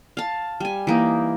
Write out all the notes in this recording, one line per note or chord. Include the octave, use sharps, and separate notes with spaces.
F5 A5
G3 G#5
E3 A#3 D#4